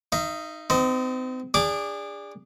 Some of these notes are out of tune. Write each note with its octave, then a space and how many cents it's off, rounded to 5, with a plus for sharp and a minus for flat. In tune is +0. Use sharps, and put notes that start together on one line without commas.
D#4 +0 E5 +45
C4 -35 D#4 +0
D4 -5 G#4 -30 D6 +0